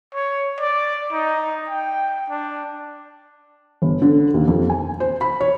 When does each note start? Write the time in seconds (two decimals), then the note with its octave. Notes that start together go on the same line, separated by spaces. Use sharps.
0.15 C#5
0.59 D5
1.12 D#4
1.70 G5
2.30 D4
3.82 G1
4.02 D3
4.34 D#2
4.48 F2
4.70 G#5
5.00 C5
5.21 B5
5.41 C#5